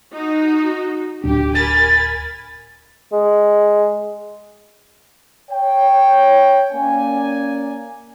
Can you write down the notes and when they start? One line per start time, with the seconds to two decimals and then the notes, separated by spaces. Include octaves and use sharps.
0.12 D#4 F#4
1.24 D1 D4 G4
1.55 A#4 G#5 B5 A6
3.12 G#3
5.50 C#5 G5
6.72 A#3 C#4 D5 G#5